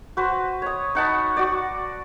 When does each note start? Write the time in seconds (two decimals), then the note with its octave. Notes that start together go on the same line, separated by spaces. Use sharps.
0.17 F#4 B4 C5
0.62 C#5 D#6
0.95 D#4 F#5 A5 B5
1.37 F#4 D5